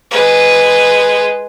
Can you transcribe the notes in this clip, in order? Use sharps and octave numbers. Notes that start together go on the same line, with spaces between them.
G#3 B4